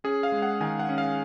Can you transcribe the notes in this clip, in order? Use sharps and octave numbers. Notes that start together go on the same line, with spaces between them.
C#4 G#4
F5
G#3
F#5
D#3 G#5
F#5
C#4
F5